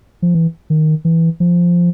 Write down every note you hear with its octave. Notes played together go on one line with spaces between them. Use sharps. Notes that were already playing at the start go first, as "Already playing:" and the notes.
F3
E3
D#3
E3
F3